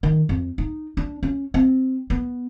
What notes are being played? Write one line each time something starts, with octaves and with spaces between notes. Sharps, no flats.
D#3
F2
D#4
D4
C#4
C4
B3